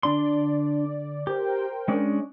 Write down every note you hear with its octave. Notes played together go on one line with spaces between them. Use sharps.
D3 D4 D5 C6
G4 A#4 C5 G5
G#3 C#4 D4